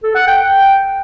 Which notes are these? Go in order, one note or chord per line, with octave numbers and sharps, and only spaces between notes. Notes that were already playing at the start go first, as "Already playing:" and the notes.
A4
F#5
G5